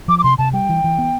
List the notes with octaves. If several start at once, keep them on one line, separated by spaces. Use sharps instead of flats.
F3 D6
D6
C3 C6
C3 A5
G3 G5
E3
E3
B3